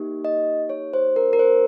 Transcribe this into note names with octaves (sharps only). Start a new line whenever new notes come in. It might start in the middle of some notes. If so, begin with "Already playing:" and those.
Already playing: A#3 D#4 G4
D#5
C#5
C5
A#4
A#4
C5